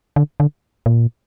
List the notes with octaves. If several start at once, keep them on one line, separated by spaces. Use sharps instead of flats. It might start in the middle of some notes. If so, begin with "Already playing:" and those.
D3
D3
A#2